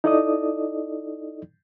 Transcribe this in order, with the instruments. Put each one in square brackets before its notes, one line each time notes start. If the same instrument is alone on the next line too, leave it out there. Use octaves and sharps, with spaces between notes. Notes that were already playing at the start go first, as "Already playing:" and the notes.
[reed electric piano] D#4 E4 A4 D5 D#5 D#6